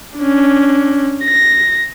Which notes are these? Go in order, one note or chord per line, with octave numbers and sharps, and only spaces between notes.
C#4 D4
A#6